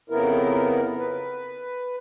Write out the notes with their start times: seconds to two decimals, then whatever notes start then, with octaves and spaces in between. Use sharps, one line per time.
0.10 F2 C#3 B3 E4 A#4
0.98 B4